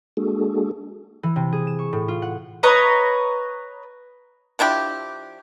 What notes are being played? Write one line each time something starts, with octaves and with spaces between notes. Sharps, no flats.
G#3 A#3 D4 F#4 G#4 A4
E3
C3
G#4
E7
C#6
A2
F4
F#5
B4 C#5 D#5 A#5
F3 D4 E4 G4